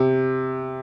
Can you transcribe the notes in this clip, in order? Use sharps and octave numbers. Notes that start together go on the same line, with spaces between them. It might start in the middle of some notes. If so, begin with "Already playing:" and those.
Already playing: C3